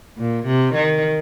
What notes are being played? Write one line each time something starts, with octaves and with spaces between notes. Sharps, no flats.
A#2
C3
D#3